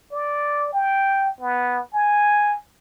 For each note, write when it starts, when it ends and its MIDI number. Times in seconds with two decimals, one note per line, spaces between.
0.11 0.73 74
0.73 1.31 79
1.40 1.79 59
1.94 2.56 80